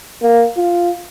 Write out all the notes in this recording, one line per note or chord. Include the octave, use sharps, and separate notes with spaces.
A#3
F4